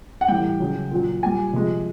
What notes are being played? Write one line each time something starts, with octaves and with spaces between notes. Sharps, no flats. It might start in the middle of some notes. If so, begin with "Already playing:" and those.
F#5
A2 E3 G3 G5
C#3 F#3
A#2 F#3
A#2 G3 G#5
C3 F3 G#3